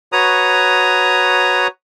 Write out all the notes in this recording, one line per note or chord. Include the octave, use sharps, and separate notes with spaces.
F#4 B4 C#5 A#5 D#6